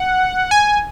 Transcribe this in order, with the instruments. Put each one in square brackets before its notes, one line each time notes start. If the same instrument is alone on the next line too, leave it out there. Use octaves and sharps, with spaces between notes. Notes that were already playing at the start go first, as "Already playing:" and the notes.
Already playing: [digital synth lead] F#5
G#5